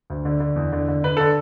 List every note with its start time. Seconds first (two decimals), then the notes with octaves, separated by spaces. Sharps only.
0.10 D2
0.25 D3
0.40 D3
0.56 E2
0.73 D3
0.88 D3
1.04 D3 B4
1.17 D3 A4